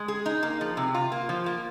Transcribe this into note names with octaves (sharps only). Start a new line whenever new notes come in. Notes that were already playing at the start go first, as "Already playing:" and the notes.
Already playing: G#3
G#4
D#4
A#3
F3
C3
F4
A#3
F3
A#3